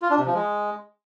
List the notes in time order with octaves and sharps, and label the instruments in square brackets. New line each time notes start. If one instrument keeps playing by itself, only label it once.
[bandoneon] F4
D4
C3
F3
G#3